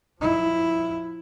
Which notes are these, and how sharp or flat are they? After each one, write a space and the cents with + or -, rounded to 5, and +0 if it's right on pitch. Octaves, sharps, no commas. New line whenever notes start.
F3 +25 E4 +0